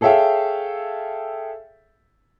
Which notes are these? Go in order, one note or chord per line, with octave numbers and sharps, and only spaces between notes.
G#4 A4 C#5 E5 F5 G5